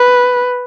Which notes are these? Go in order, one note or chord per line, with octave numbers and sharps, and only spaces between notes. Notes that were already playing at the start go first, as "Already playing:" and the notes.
Already playing: B4